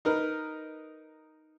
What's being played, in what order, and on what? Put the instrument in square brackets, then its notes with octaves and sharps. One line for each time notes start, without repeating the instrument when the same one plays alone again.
[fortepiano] D#4 A#4 B4